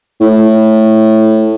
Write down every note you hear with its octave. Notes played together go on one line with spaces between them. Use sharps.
A2